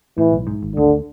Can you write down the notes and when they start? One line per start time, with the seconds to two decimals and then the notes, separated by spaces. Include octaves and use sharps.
0.18 A2 E3
0.32 B1
0.47 G#2
0.63 G#1
0.76 D2 D3